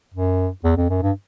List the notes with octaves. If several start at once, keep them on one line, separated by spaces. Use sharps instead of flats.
F#2
E2
F2
F#2
G2